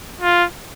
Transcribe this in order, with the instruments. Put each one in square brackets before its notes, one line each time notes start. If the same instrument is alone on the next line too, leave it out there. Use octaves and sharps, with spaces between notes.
[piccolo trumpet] F4